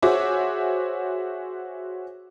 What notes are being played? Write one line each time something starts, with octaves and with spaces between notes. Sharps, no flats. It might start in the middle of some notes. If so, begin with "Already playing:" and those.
F#4 G#4 C5 C#5 E5 D6